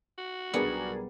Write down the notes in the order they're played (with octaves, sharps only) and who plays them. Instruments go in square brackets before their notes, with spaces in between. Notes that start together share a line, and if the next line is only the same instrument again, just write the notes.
[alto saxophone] F#4
[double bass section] B1 G3 [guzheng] B3 [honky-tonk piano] D4 G#4 A#4